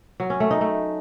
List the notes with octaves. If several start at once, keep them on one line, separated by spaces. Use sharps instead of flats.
F#3
C#4
A3
D#4
A3